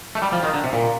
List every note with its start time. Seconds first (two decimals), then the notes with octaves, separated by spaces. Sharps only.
0.15 A3
0.22 G3
0.33 F3
0.43 D#3
0.54 D3
0.64 C3
0.73 A#2